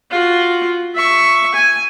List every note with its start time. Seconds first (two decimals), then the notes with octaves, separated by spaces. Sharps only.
0.11 F4 F#4
0.95 E5 C#6
1.54 G#5